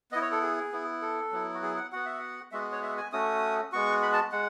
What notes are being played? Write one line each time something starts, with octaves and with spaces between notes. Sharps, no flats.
B3 E4 D#5
C#5
A4
G#4
B3 E4
A4
F#3 B3 E4
F#4
G#4
F#5
B3 F#4 F#5
E5
F#5
G#3 B3 F#4 E5
C#5
E5
G#5
A3 C#4 F#4 D#6
G#3 B3 F#4 C#6
B5
A5
G#3 F#5